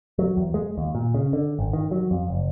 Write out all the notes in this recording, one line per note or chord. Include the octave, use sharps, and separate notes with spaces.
F#3
E2
G#3
D#2
A#2
C#3
D3
G#1
D#3
F#3
F2
F#1